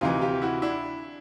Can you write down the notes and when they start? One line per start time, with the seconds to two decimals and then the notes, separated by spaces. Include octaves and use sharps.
0.01 D2 C3 E3 D#4 F4
0.21 F4 G4
0.42 E4 F#4
0.62 D4 E4